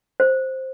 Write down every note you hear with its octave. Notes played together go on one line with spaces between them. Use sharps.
C5